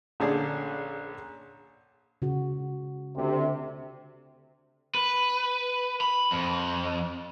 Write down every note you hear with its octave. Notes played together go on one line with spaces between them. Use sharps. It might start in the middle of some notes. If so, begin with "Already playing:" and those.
A#1 D3 C#4 G#4 D5
C#3 F#4
D2 C3
B4
B5
F2